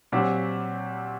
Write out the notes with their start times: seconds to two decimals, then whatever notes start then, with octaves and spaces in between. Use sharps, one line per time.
0.12 A#2 F#3 C4 G4